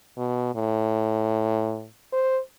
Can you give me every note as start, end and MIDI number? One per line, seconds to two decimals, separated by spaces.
0.18 0.53 47
0.55 1.87 45
2.13 2.40 72